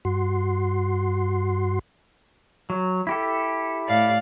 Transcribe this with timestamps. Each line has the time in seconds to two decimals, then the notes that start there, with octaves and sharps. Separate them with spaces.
0.05 G2 F#4 C6
2.70 F#3
3.07 E4 G4 A4
3.88 A2 D5 F5